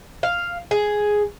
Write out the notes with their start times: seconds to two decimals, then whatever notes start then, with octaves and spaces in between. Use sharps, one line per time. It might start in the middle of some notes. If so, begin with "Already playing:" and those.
0.23 F5
0.71 G#4